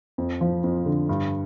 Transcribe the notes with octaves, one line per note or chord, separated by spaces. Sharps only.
F2
F3
F2
D3
G2